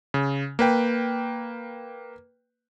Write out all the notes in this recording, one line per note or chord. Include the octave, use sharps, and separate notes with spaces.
C#3
A#3 B4 G5